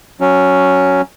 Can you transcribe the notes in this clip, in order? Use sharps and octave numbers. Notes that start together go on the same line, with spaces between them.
F#3 C#4